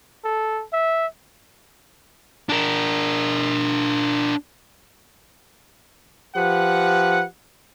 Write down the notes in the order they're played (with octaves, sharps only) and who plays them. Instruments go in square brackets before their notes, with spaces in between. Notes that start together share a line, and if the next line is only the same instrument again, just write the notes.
[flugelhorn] A4
E5
[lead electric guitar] D4 A#4
[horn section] F3 G4 B4 F#5